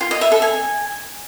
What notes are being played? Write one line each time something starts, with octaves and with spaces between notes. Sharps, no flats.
F4
D#5
E5
A4
G#5